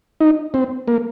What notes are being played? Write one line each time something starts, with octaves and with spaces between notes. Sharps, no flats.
D#4
C4
A#3